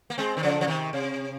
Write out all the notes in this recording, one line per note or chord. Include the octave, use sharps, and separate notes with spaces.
A#3
G#3 C4
D#3
C#3 F3
F3
C3 D#3
C3